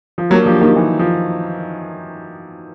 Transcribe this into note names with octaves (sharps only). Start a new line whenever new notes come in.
F3
F#3 A#3 D4 G4
F3
D#3
E3
F3